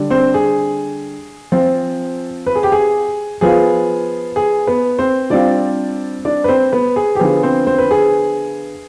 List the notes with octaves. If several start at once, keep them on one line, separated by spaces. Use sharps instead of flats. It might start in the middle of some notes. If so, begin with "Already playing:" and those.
Already playing: D3 G3 D4
C4 C5
G#4
F3 C4 F4
B4
G#4
G4
G#4
F3 B3 F4 G#4
G#4
B3 B4
C4 C5
G3 C4 D4 F4 D5
D4 D5
B4
C4 C5
B3 B4
G#4
G4
D3 F3 B3 G#4
C4 C5
C4 C5
B4
G#4